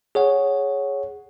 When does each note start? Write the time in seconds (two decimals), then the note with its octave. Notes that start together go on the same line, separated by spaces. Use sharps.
0.15 G#4 C#5 F#5